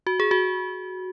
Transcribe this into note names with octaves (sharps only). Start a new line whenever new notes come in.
F#4
G#4
F#4